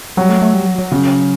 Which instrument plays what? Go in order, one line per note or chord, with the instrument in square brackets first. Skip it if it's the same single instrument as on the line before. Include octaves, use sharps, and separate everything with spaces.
[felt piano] F#3 [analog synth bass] G3
[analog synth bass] A3
A3
G3
F#3
F#3
[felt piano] C#3